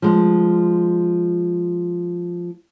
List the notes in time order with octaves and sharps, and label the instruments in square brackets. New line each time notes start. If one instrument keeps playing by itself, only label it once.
[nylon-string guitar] F3 G#3